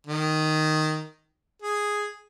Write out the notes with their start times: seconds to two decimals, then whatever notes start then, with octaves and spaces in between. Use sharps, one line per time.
0.07 D#3
1.62 G#4